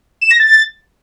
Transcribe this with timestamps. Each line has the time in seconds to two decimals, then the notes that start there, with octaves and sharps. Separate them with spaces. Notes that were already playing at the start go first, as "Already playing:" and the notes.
0.21 E7
0.31 A#6
0.40 A6